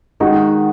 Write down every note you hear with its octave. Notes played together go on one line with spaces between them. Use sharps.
D#3 G#3 D#4 F#4